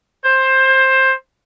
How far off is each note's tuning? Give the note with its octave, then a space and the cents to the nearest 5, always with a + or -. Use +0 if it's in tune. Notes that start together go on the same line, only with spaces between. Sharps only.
C5 +15